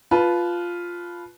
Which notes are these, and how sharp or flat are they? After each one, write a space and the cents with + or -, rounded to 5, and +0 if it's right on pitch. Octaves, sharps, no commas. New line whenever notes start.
F4 +0 B4 +0 A5 -25